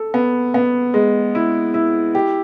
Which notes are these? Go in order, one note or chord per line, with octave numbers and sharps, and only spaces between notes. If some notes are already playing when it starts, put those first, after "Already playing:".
Already playing: A4
B3
B3
G#3
E4
E4
G4